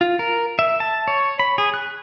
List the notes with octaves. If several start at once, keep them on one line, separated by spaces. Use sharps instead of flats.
F4
A#4
E5
A5
C#5
B5
G#4
F#6